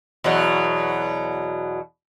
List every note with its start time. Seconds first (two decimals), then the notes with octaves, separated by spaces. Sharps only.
0.24 E2 B2 F#3